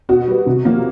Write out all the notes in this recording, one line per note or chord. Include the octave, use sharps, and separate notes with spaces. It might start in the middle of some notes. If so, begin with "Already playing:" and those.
B2 F#4
G3 B3
C3
F3 A#3